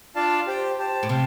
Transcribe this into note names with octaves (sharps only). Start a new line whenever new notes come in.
D4 F4 D5 F5 A5
G4 C5 G5
G4 C5 A5
A2
C3 G4 F5 A5